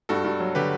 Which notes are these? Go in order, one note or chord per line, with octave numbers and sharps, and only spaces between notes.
G2 F#4 A4
G2
F#3
D3 G4 B4